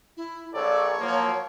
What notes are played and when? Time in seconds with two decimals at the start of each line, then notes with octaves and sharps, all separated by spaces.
0.17 E4
0.54 A#1 A4 C#5 D5
0.99 F3 F#3 A#3